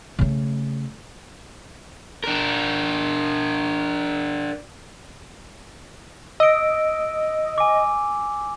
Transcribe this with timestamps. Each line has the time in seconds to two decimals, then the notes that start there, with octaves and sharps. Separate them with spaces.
0.19 C#3 A3
2.24 D4 A#4
6.40 D#5 E6 D7
7.58 G#5 D6